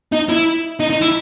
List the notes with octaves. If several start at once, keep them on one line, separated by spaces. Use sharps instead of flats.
D#4
E4
D#4
D#4
E4